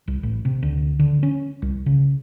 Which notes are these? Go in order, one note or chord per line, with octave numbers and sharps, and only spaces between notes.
C2
A1
C3
D2
D3
C#4
C2
C#3